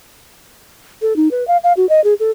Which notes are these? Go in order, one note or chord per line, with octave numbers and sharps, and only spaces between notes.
A4
D#4
B4
F5
F5
F#4
D#5
G#4
A4